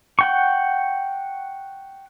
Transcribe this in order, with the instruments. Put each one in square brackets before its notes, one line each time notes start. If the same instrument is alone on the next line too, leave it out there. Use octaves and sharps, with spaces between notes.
[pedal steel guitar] F#5 G5 C#6